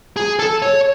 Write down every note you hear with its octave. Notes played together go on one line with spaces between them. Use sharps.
G#4
A4
C#5